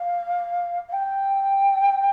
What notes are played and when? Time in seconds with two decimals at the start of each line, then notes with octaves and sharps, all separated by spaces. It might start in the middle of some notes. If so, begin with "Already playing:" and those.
Already playing: F5
0.88 F5
0.92 G5